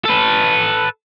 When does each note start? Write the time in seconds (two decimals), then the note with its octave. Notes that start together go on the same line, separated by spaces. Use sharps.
0.05 A4 B4